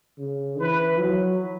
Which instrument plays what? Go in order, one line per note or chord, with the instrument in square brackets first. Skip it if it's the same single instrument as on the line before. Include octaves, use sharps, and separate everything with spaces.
[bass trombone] C#3
[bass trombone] E3 [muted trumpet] B4
[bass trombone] F#3